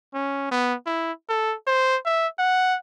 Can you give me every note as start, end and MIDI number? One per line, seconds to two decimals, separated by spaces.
0.14 0.48 61
0.51 0.74 59
0.86 1.12 64
1.29 1.55 69
1.67 1.97 72
2.06 2.28 76
2.39 2.76 78